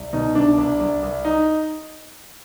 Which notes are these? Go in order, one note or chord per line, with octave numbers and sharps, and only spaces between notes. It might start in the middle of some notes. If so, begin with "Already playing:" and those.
Already playing: C2
B2 D#4
C2 D4
C2
C2
C2
D#4